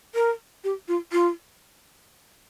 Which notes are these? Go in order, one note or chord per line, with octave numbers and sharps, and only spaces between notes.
A#4
G4
F4
F4